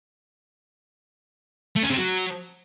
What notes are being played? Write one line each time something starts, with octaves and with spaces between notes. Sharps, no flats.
A3
C#4
C3
F#3